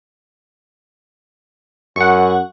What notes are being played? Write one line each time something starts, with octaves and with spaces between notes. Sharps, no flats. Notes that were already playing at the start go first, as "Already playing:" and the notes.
F#2 F#5 C#6